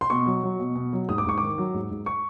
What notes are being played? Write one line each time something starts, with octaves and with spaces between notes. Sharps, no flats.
C6
B2 C#6
F#3
F#3
B2
B2
F#3
G#2 D#6
D6
G#2 C#6
D#3 D6
F#3
G#2
G#2
C#6